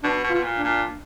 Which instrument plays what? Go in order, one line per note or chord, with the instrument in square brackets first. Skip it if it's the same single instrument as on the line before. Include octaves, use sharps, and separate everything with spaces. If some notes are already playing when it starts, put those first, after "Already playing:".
[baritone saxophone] B2 [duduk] D4
[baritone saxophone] B2
[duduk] F4
[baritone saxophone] B2
A#2
[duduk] D4
[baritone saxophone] A#2